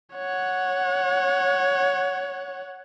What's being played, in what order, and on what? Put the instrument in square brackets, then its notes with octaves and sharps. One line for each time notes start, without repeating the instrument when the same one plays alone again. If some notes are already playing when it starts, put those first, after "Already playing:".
[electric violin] C#5 F#5